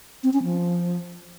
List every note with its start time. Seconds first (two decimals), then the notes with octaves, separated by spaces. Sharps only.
0.23 C4
0.33 C#4
0.43 F3